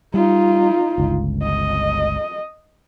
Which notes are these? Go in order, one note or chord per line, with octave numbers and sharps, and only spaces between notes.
G3 D#4 F4
G1 C#2
D#5